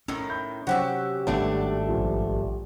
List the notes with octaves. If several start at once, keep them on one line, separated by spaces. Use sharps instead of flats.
A2 D#3 C#4 E6
E5 B5 G6
C3 F#3 C#4 F#4 G4 C5 E5
G#1 G2 D#3 A3 D4
A#1